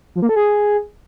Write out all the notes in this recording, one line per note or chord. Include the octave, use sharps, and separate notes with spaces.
F3
A#3
A4
G#4